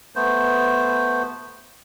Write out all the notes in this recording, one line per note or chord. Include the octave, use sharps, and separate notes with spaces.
A3 B3 C5